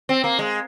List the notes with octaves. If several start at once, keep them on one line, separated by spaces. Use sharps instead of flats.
C4
A#3
G#3